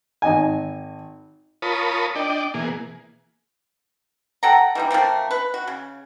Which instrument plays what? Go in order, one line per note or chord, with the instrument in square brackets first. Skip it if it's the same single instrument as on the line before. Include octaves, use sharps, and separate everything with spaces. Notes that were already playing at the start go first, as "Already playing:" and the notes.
[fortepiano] G#1 D#5 G#5
[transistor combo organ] F4 A#4 C#5 A5 B5 D#6
D4 D5 D#5 G5
B2 E3 A#3 G#4
[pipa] A4 F#5 G5 A#5
E3 G3 D#4
F3 A3 A#3 C4
B4
F#4
C#3